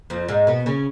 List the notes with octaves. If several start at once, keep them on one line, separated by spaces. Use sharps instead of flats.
F2 F3
G#2 G#3
B2 B3
C#3 C#4